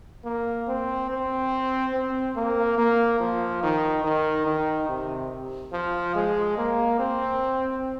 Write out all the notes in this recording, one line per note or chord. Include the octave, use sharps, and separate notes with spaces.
A#3
C4
C4
C4
A#3
A#3
F3
D#3
D#3
D#3
C3
F3
G#3
A#3
C4